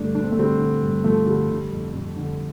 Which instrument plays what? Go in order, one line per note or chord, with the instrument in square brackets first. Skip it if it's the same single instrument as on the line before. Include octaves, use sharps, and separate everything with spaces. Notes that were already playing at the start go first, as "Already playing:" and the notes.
Already playing: [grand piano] G2 D3 A3 D4
G2 D4
C4
A3
D3 G3 C4
D3
G2
G2 F3 A3
D3 G3
D3
F2
F2
D3